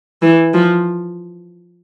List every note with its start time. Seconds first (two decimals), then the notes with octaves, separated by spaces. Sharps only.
0.22 E3
0.54 F3